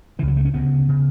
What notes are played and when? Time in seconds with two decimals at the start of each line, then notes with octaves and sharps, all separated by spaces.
0.19 C#3 E3
0.23 C#2
0.28 F#3
0.37 A3
0.45 C#4
0.54 D2 C#3 B3
0.89 C#3